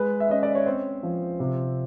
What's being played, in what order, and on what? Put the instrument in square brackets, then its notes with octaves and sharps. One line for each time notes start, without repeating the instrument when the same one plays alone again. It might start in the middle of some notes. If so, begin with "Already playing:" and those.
Already playing: [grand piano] G#3 B4
E5
C#4 D#5
D5
C#5
C4 C5
F3
C3